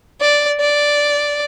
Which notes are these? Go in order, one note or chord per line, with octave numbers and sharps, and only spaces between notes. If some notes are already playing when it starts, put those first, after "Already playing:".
D5
D5